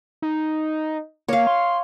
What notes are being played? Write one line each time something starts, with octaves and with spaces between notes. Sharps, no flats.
D#4
A#3 C#5 F5
C6